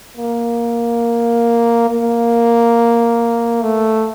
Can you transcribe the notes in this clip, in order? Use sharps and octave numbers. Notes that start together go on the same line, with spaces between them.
A#3
A#3
A3